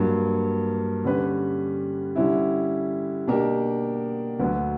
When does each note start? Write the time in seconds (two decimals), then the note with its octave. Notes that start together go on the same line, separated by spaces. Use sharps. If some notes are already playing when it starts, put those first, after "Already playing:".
Already playing: G2 F#3 A#3
1.04 D3 G3 C#4 G4 B4
2.16 D3 G3 C#4 E4
3.27 B2 A#3 D4 G4 A#4
4.39 D2 D3 F#3 B3